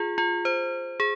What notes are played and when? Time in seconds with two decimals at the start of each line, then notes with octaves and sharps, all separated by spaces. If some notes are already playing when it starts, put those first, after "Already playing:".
Already playing: F4 G#4
0.18 F4
0.45 C5
1.00 G#4